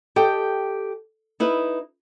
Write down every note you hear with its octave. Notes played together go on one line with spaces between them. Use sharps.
G4 A4 D#5 G5
D#4 E4 B4